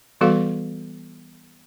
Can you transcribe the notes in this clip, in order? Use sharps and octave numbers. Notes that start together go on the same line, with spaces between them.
E3 G3 B3 F#4 A4 F5